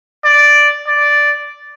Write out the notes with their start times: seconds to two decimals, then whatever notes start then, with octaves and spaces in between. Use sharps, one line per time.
0.24 D5
0.87 D5